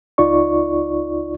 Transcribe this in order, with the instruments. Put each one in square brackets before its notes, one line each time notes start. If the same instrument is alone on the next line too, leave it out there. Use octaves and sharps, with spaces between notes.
[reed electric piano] C#2 D#4 F4 D5 C#6